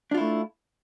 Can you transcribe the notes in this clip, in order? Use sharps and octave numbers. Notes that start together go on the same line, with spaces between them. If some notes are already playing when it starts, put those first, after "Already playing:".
A3 D4 E4 F4